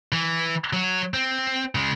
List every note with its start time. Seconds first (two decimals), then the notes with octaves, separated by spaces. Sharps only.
0.12 E3
0.73 F#3 F#4
1.14 C4
1.75 C#3 G#3